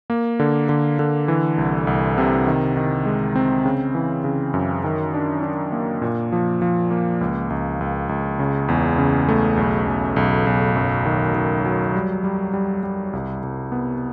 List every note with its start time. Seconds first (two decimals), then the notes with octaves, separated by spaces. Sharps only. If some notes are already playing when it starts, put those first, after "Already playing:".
0.10 A#3
0.39 D3
0.69 D3
0.99 D3
1.28 E3
1.58 C2
1.87 C2
2.18 C3
2.47 D#3
2.77 D#3
3.05 G#3
3.36 C4
3.65 C#3
3.95 E3
4.24 C#3
4.54 F#2
4.84 D#3
5.14 D4
5.43 D4
5.72 A#3
6.02 A#2
6.32 F3
6.62 F3
6.91 A#3
7.21 C#2
7.50 C#2
7.81 C#2
8.09 C#2
8.39 C#3
8.68 E2
8.98 C#3
9.29 A3
9.57 B1
9.88 B1
10.16 B1
10.47 B1
10.76 F#2
11.06 D#3
11.35 D#3
11.65 F#3
11.95 G3
12.24 G3
12.53 G3
12.83 G3
13.13 C2
13.43 C2
13.72 B3